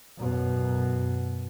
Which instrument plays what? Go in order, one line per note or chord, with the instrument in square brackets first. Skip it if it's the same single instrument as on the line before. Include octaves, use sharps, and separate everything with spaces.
[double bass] F#2 B2